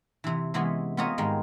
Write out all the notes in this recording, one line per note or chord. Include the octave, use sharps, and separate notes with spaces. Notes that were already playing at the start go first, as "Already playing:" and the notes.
C3 E3
C3 E3 G#3 B3 C#4
B3 C4 F4 C#5 D#5 A#5
G#2 D#3 G3 G#3